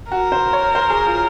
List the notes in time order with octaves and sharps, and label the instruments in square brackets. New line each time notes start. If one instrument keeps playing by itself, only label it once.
[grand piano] F#4 [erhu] A#4
[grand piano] C5
C#5
C5
G#4
F4